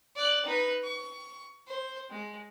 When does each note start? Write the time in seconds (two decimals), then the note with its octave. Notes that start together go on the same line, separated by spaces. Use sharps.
0.16 D5 F#6
0.45 D#4 B4
0.83 C#6
1.67 C5
2.10 G#3